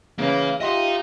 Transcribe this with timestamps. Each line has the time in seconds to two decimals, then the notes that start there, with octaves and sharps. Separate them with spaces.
0.19 C#3 E3 A#3 C#4 F5
0.61 F4 G4 D#5 E5 F#5 A#5 C6